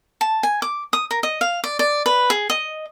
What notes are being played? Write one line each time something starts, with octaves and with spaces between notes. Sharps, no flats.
A5
G#5
D6
D#6
A#4
D#5
F5
D5
D5
B4
G#4
D#5